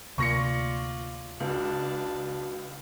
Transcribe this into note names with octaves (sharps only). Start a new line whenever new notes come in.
D2 C3 A#3 F4 D5 C#6 A#6 C#7
C#2 D4 F#4 B4 A5